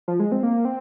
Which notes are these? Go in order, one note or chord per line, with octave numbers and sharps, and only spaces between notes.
F3
G#3
C4
A#3
C4